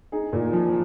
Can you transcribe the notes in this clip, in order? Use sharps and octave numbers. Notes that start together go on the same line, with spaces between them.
D#4 G#4
A#2
F3